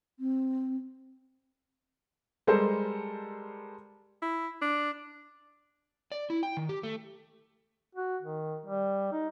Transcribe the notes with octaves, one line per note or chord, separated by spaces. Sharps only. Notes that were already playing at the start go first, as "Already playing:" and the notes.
C4
G3 G#3 A4 A#4 C5
E4
D4
D5
E4
G5
D#3
G4
A3
F#4
D#3
G3
D#4